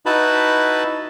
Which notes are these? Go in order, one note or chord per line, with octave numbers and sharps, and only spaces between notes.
D#4 E4 F#4 B4 A5 B5